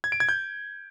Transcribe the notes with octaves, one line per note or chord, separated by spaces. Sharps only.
G#6
D7
G#6
G6